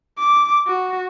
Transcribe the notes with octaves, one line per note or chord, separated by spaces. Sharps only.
D6
F#4